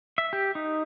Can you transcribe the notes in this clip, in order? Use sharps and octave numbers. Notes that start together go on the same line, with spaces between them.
E5
G4
D#4